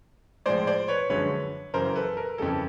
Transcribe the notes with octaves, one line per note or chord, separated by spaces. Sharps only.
A2 F3 G#3 C5 D5
C5 D5
B4 C#5
F#2 D3 F3 G#3 B4 C#5
F#2 C#3 E3 A#4 C5
A4 B4
A#4
F2 C#3 E3 G3 A4